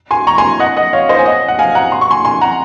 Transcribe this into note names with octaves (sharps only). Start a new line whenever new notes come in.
G#5 C6
A#5 C#6
G#5 C6
D#5 F#5
D#5 F#5
C#5 F5
C5 D#5
G#5
D#5 F#5
F#5
F5 G#5
F#5 A#5
C6
C#6
G#5 C6
G#5 C6
F#5 A#5